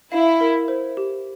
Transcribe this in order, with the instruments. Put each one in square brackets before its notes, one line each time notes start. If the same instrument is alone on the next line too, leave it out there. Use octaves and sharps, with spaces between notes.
[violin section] E4 [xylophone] F5
[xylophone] A#4
C5
G4